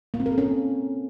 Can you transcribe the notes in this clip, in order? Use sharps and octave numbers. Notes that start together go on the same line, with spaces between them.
A#3
C4
A#4
A4
C#4